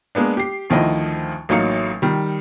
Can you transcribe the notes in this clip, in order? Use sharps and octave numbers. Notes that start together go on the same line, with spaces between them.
G#3 A#3 B3 D4
G4 C7
D2 D#3 F3 E4 D#5
A1 F#3 A#3 D#4 F5 C#7
D#3 G3